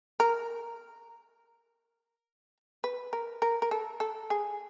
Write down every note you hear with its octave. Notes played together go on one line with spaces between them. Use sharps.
A#4
B4
A#4
A#4
A#4
A4
A4
G#4